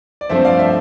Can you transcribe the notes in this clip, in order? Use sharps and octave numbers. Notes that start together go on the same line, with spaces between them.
D5
G2 F3 A3 C4 C5 E5
D5 F5
C5 E5